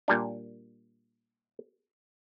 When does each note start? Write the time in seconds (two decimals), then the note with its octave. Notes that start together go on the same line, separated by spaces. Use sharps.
0.08 A#2 G3 D4